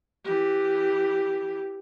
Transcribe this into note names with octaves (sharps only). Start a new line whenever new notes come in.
E3 G4